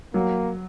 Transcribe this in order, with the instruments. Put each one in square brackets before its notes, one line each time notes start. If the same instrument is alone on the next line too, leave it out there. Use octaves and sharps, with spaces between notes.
[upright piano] F#3 [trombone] A#3